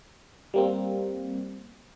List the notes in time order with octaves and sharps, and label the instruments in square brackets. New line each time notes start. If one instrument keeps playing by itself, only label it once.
[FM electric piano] G3 A#3 C4